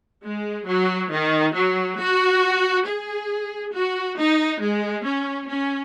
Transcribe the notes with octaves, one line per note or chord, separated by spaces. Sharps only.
G#3
F#3
D#3
F#3
F#4
G#4
F#4
D#4
G#3
C#4
C#4